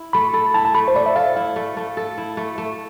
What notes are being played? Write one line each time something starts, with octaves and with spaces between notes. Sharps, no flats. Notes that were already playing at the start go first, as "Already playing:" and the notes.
Already playing: E4
A3 B5
A4
E4 A5
A5
A3 B5
C5
A3 D5
E5
A4 F5
E4 F5
A3
A3
A4
E4
A3
A3